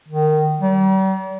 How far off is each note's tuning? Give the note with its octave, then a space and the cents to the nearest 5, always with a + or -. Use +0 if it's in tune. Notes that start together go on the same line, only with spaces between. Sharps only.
D#3 -15
G3 -40